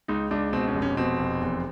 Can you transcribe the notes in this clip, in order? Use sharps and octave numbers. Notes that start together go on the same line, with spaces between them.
C#2 D#4
C#2 D4
B2 C4
C#4
F1
C#4
B2 C4
F1
E2